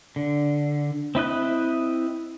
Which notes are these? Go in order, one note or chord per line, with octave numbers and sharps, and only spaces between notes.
D3
C4 E4 D#5 F#6